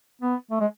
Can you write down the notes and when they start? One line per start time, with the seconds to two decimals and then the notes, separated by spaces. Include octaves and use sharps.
0.21 B3
0.51 A3
0.61 G#3